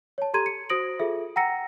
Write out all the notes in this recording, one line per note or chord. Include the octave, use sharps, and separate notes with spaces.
C#5 A5
G4 A4 A#5 C6 G#6 D#7
C#7
F#4 C5 D#6 A#6 D7 F#7
F4 G#4 A4 E5
F#5 G5 A#5 E6 A#6 C#7